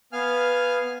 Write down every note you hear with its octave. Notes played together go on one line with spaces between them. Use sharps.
B3 F5 G#5 F6